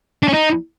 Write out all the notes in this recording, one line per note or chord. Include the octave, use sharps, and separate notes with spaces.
D4
C#4
D#4